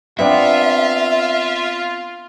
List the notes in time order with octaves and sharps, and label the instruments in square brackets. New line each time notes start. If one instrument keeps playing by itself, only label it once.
[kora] B3 C4 D4 [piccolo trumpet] F4 [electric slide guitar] E5